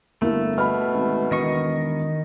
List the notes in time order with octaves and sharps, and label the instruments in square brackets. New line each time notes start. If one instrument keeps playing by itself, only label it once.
[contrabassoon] G1 [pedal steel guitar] A3 [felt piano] A#3 E4 A#4
[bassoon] B2 [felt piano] B5 F6
[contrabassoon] G#1
[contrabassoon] E1 [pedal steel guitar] D#3 D#5 C#6